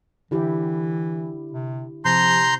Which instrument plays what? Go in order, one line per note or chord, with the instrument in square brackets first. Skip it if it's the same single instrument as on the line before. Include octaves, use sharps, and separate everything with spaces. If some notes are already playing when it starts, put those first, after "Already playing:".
[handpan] D3 E4 G4 [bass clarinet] E3
[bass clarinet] C3
[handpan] C3 [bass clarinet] F3 [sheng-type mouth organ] A#5 C6 G6